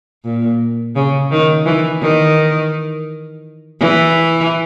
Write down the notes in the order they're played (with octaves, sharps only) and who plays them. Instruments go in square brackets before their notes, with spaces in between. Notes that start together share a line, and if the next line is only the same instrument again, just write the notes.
[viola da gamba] A#2
C#3
D#3
E3
D#3
E3